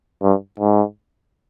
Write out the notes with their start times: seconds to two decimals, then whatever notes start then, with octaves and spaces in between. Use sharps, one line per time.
0.23 G2
0.60 G#2